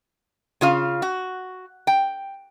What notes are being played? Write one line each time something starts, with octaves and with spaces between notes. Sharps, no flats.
C#3 F4 F5
F#4
G5